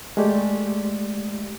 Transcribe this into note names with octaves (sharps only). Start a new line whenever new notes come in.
G#3 A3 G4 D5